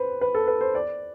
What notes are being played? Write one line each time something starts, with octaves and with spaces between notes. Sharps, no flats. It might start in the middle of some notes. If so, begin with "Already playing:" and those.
Already playing: B4 C5
B4
A4
B4
C5
D5